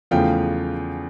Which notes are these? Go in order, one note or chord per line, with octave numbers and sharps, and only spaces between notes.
E2 C#3 F3 A3 F5 G5